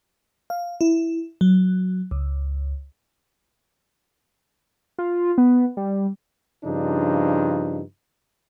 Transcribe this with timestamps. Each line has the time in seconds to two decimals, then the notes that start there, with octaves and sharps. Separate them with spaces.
0.50 F5
0.81 E4
1.41 F#3
2.11 C#2
4.98 F4
5.38 B3
5.77 G3
6.65 G2 C#3 F3 D4 D#4